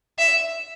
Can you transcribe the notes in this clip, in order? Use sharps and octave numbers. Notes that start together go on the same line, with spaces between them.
E5